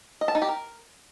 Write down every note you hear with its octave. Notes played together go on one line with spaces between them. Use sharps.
D#5
A5
D#4
G4
A#4